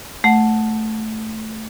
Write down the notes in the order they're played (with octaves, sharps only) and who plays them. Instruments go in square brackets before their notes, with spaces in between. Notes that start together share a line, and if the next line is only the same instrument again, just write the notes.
[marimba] A3 F#5